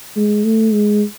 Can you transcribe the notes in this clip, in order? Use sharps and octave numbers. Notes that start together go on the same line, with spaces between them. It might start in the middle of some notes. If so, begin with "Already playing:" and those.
G#3
A3
G#3